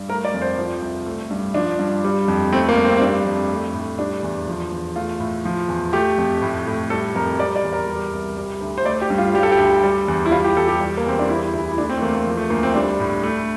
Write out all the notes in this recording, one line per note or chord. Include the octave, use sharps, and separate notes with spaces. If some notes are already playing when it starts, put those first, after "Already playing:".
Already playing: G2
A3 A#4
D5
F2
C5
F3
C2
A3
G2
F3 D4
G2
G3
F2
A3 C4
A#3
G2
C4
C4
G3 D4
F2
A3
A2
G3 D4
E2
F3
E2
A3 F4
A2
F3
E2
A3 G4
F2
A2
A2
G3 A4
F2 A#4
G3 D5
D5
E2
A#4
G3
C2
G3
D2
C5
A3 D5
G4
G2
F4
G3 G4
A4
G4
D2
G3
E2
E4
G3 F4
G4
E2 A4
G4
G3
A#3
E2 C4
D4
G3 E4
D2 E4
E4
A3 D4
C4
A3
E2 A#3
A#3
F3
A3
D2 A#3
C4
G3 D4
A2
A3